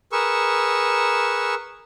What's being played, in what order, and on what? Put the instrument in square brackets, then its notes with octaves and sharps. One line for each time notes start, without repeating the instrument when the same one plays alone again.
[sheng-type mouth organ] G#4 A#4 B4 C#6 E6